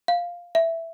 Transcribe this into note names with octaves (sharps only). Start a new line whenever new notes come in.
F5
E5